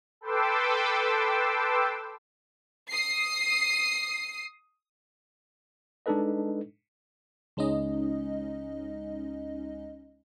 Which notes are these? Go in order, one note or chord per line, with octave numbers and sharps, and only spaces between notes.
A4 B4 G5 C6 D6 E6
D#6 C7
G#3 D4 D#4 A4 B4 D#5
C#2 G#3 C#4 D#4 D#5